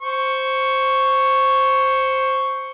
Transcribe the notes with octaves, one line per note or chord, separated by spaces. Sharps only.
C5 C#6